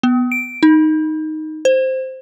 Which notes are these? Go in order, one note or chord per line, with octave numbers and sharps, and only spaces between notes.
B3
D7
D#4
C5